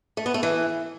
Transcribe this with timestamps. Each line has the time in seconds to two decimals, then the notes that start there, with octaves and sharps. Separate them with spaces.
0.17 A3
0.26 B3
0.34 A3
0.43 E3